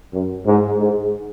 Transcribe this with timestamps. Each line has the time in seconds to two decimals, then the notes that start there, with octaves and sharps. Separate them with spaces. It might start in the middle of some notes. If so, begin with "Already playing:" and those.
0.13 F#2
0.46 G#2
0.78 G#2